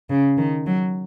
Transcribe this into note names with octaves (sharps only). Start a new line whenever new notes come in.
C#3
D#3
F#3